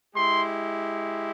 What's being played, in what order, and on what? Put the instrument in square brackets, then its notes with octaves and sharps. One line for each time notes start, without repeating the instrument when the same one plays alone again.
[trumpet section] G#3 E4 G4 C6